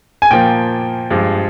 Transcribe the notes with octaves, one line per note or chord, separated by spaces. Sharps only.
G#5
A#2 F3 A#3 G5
G2 F3 G#3